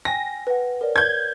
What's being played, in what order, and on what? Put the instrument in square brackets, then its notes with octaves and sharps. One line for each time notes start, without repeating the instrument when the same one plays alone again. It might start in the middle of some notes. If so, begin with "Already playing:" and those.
[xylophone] G5 G#5 [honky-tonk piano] A#6
[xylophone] B4 F#5
A#4 C#5 D5
[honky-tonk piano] G6 G#6